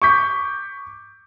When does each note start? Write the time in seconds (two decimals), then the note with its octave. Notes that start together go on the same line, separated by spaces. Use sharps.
0.02 C#6 D6 G6 B6